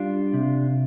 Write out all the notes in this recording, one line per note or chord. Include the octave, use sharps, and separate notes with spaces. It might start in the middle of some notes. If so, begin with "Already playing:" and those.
Already playing: G3 D4 F4
C3